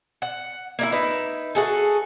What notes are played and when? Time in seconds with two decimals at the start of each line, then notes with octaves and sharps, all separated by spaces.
0.22 F#5
0.79 A#3 D#4 E4
0.92 D#4 B4 E5
1.55 F#4 G#4 A4